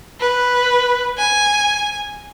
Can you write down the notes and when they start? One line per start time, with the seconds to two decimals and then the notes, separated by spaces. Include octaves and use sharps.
0.20 B4
1.18 G#5